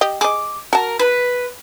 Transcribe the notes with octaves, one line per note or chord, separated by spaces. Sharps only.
G4 D#5
G#4 D#5 D6
F#4 A#4 A5
B4